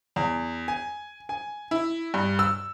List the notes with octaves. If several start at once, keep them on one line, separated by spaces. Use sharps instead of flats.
E2
G#5
G#5
E4
G2
E6